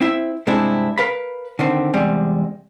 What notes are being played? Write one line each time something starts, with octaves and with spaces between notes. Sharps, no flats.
C4 E4 E5
G2 C3 G#3 C4 D4 E4
A#4 B4 F5 B5
D3 D#3 C4
E2 C3 G3 G#3